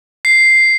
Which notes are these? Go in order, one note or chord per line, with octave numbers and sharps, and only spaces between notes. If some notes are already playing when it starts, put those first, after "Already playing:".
C7